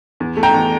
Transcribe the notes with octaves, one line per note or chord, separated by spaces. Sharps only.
E2
A3
G5 A#5
E2